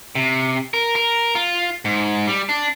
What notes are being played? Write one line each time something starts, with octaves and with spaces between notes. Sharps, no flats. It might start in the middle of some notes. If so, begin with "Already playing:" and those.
C3
A#4
A#4
F4
G#2
G3
D4